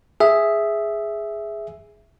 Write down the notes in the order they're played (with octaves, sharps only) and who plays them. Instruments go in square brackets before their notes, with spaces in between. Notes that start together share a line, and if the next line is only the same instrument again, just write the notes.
[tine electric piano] G#4 E5